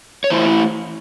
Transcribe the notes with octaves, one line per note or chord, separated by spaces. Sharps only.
C#5
E3 A3 E4 C5